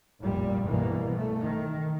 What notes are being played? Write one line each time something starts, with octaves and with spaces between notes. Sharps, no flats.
F1 A#1 A#2 G3
C2 G2 B2 E3 A#3 B3
A3
D#3